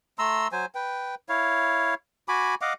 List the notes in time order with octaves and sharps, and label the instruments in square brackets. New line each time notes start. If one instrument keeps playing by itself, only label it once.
[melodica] A3 A#5 C6 E6
F#3 C5 G#5
B4 G5
E4 C#5 F5
F#4 G#5 B5 D6
D#5 F5 F#5 D6